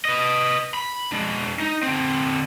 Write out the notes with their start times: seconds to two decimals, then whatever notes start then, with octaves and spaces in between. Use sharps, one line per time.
0.05 B4 D#5
0.74 B5
1.12 G#3 D4
1.60 D#4
1.83 D3 C4